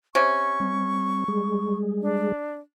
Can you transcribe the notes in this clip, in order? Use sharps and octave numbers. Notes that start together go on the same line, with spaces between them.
C3 C#4 C#6
G3 C4
G3 G#3 G#4
D4